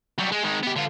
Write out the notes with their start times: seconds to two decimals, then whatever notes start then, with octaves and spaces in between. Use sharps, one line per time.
0.19 F#3 G3
0.32 G#3
0.44 D#3 G#3
0.63 B3 G4
0.76 D3 F4